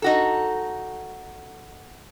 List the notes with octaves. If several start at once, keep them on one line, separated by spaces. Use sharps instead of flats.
D#4 F#4 A4